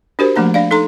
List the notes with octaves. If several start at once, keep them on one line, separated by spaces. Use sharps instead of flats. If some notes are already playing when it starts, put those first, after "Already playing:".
D4 F#4 G4 A#4 C5
F3 A3 A#3 D4 A#5
D4 D5 F5
D#4 A4 A#5 C6